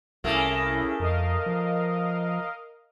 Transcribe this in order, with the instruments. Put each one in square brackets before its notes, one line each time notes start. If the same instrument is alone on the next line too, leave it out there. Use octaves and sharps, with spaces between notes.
[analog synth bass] C2 [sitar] A3 A#3 [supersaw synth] C#4 E4 G#4
[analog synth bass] F2 [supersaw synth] A#4 D#5 F5
[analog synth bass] F3